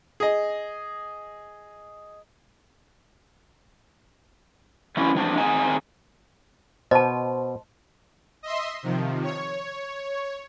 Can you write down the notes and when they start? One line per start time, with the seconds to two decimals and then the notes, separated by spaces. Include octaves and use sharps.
0.20 G#4 D#5
4.97 E3 F#3 A#3 C#4 E4
5.15 E3 F3 G#3 C4 D4
5.38 D#3 C4 G#4 F#5 G#5 A#5
6.91 B2 C5 D#5 A5
8.43 D#5 E5 C6
8.83 C3 D#3 F3
9.23 C#5